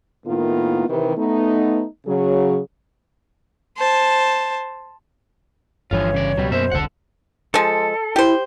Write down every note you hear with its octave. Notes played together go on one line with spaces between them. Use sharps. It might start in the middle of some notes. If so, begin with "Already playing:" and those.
A2 D#3 A#3 B3 E4 F4
C3 D#3 E3
A3 B3 D#4
C#3 F#3 G#4
C5 A5
G1 G2 D3 E3 F3 F4 C#5
C#3 D5
C#2 B2 F#3 G3
F#2 B2 A#3 C5 E5
E1 C2 D3 A4 F#5
F3 G#3 A4
E4 G4 C5